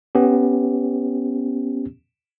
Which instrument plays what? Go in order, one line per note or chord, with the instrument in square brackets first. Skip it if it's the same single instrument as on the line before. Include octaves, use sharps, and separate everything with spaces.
[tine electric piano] B3 C#4 G4